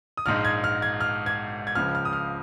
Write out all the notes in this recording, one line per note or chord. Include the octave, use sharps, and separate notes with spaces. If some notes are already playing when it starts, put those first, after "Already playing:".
D#6
A#1 G#2 G#3 F6
G#6
F6
G#6
F6
G#6
G#6
C#2 C#3 F3 F6
F6
D#6
F6